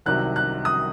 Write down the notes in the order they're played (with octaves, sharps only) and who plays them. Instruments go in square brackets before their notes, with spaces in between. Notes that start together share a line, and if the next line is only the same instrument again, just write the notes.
[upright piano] C2 C3 D#3 F#3 F#6
F#6
D#6